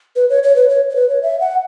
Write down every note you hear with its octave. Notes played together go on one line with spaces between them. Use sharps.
B4
C#5
C#5
B4
C#5
C#5
B4
C#5
E5
F#5